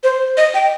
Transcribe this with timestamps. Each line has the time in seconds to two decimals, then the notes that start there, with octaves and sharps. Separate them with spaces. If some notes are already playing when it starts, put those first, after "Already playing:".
0.03 C5
0.37 D#5
0.54 G5